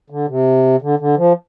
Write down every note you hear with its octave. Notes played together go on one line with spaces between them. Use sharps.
D3
C3
D3
D3
F3